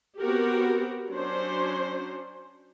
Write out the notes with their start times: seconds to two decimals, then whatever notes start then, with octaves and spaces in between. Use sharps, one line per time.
0.20 B3 C4 F#4 G4 A#4
1.10 F#3 C#4 D4 C5